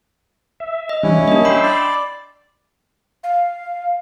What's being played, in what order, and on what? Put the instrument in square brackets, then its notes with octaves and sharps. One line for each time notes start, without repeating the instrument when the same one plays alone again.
[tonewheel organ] E5
[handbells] D#5
[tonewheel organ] E3 G3 D4 [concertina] C#4 E4
[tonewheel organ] G3 A#3 [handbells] D4 D#5
[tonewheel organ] G5 C6 E6 [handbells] B5
[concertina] D5
[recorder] F5